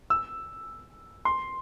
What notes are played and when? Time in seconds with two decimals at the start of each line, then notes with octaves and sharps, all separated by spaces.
0.10 E6
1.25 C6